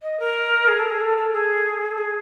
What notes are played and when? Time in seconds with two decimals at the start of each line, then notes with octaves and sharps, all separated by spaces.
0.02 D#5
0.19 A#4
0.68 G#4
0.79 A4
0.89 G#4
1.00 A4
1.17 A4
1.33 G#4
1.91 A4
1.98 G#4